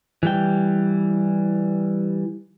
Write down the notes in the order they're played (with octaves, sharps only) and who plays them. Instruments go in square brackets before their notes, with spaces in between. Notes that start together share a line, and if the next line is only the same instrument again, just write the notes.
[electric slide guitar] E3 G3 G5